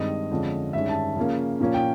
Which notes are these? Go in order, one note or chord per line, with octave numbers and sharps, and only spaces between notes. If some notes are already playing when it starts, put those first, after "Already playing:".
Already playing: G2 D#3 G#3 C4 D#5
F2 D3 F3 G#3 C#4
G2 D#3 G#3 C#4 E5
A5
C#3 F3 A#3 C#4
A#2 F3 A#3 C#4
G5